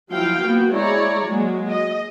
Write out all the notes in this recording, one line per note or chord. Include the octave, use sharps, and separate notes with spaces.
F3 F#3 E4 F5 G5
A#3 B3 F#4
G#3 E4 C#5 D5 A#5
F#3 G#3 A#3
D#5